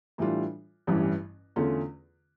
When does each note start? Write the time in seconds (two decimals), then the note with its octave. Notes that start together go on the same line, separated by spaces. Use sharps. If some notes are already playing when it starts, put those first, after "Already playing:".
0.18 A2 E3 G3 D4 F4
0.87 A1 G2 E3 G3 C#4
1.56 E2 D3 A3 C#4 F4